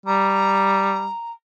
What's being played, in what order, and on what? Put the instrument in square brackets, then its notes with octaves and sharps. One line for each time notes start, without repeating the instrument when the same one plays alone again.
[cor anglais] G3 [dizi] A#5